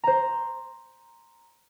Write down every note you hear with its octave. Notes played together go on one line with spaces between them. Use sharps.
C5 A#5